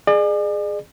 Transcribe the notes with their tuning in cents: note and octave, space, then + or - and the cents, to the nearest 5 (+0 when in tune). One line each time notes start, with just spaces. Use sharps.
G#4 +0 D5 +45